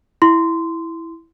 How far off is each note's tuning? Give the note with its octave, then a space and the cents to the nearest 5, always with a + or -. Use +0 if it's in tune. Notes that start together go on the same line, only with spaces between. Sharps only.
E4 +0 C6 -15